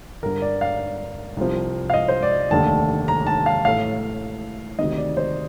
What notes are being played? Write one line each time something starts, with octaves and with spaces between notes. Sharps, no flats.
G1 G2 D3 A#4
D5
F5
C2 C3 F3
F5
D#5
C5
D5
F1 D#2 D3 A3 A5
A#5
A5
F5
A1 A2 A3 F5
D2 C3 D#3 D#5
D5
C5